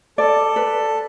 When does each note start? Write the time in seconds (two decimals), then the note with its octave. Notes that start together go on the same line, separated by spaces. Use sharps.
0.18 A4 D5
0.56 B4